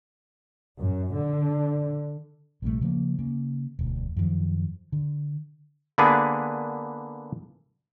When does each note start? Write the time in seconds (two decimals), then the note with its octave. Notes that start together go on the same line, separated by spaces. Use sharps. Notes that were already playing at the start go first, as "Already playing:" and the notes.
0.79 F#2
1.14 D3
2.62 A#1 C3 G3 A3
2.81 C#3 F3 G#3 A#3
3.19 C#3 A#3
3.79 E1 D2
4.16 F#2 D#3 F3
4.92 D3
5.98 D3 A#3 B3 D4 G#4 B4